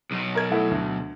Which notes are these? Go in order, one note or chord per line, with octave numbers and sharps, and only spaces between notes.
B1 B2
A#4 G#6
A3 E4 F#5
D2